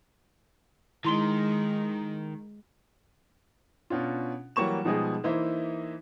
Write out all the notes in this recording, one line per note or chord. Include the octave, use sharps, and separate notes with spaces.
D#3 G#3 E4 C6 G7
B2 C#4 D4 F4
E3 F#3 G3 A#3 C#6 E7
B2 F3 G3 G#3 D#4 G#4
E3 A#3 D#4 E4 C5 E5